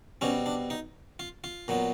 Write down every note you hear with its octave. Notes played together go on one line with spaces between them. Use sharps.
B2 G3 C4 C#4
D4
D#4
F4
F4
A#2 F#3 B3